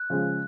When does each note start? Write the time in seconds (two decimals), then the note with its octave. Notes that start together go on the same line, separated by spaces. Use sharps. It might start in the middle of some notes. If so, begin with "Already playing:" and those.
Already playing: F#6
0.10 C#3 F3 G#3